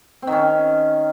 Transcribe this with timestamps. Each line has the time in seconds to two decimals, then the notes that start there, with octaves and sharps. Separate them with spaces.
0.22 C4
0.27 D#3
0.32 C#4